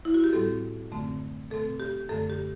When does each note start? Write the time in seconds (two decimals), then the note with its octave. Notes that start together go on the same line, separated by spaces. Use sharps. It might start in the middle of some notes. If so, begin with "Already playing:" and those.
0.05 E4
0.14 F#4
0.24 G4
0.33 A2 G3 C4 A4
0.91 F#2 D3 A3 C4
1.50 B2 A3 C4 A4
1.80 G4
2.09 F#2 D3 A3 A4
2.30 G4